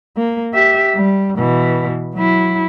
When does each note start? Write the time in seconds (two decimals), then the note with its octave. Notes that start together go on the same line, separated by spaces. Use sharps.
0.17 A#3
0.54 G4 E5
0.95 G3
1.38 B2 E3
2.15 F#3 E4